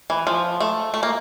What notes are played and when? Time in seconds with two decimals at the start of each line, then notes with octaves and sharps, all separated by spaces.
0.10 E3
0.27 F3
0.60 A3
0.94 A3
1.03 A#3